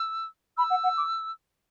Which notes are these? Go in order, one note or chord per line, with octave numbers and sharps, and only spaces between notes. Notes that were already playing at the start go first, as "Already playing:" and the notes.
Already playing: E6
B5 E6
F#5
F#5
D6